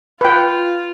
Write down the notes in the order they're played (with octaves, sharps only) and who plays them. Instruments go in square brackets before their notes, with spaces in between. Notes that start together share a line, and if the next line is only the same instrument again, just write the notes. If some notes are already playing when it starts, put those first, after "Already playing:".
[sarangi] F4 [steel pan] B4 G5